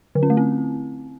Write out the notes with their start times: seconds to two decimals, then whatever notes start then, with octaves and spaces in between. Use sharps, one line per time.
0.15 D3
0.23 C#4
0.30 A3
0.37 C4